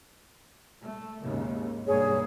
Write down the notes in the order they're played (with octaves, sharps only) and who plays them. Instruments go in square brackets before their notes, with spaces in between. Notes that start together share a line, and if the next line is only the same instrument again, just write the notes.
[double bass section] A3
G#1 D#2 C#3
[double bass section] B1 G2 A#3 [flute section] G#4 C#5